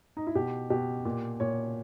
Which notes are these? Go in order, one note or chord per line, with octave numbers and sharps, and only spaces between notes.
D#4
E4
B2 G4
B2 G4
A#2
A#2 C#5